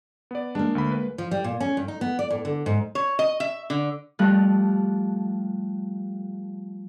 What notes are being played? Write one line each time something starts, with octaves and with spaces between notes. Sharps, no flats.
B3 D5
G#3 A#3 D4
D2 B5
B4
F3
G3
A#2
C#4
G2
D#4
B3
D5
A2
D3
G#2
C#5
D#5
E5
D3
F3 G3 A3 F#6